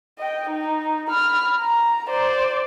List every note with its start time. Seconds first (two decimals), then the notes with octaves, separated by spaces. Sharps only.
0.18 D#5 G5
0.50 D#4
1.09 B5 F6
1.60 A#5
2.10 C5 D5